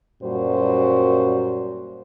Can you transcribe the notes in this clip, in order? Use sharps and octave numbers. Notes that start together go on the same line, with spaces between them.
F#2 A#2 G3 F#4 C5